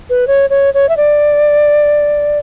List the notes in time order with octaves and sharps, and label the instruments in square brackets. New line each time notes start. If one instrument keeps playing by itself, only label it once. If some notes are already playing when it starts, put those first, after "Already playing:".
[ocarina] B4
C#5
C#5
C#5
E5
D5